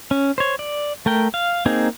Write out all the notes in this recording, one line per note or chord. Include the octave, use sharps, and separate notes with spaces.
C#4
C5 C#5
D5
A3 A#4 G5
F5
A#3 C4 D#4 G#4